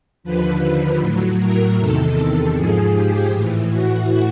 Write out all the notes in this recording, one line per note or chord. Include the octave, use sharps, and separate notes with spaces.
D#2 D3 F3 B4
A2 F#3
A#4
E2 C3 D#3 A4
G#2 F3 G#4
G4
A2 E3
F#4